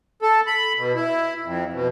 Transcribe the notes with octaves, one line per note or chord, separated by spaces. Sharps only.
A4
B5
B2
E4
F2
B2